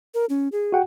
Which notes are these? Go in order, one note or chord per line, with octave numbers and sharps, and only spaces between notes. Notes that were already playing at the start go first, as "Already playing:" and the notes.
A#4
C#4
G#4
F#4 F#5 G5